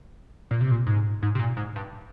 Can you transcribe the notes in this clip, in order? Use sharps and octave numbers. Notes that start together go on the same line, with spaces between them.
A#2
C3
A#2
G#2
G#2
C3
A#2
G#2
G2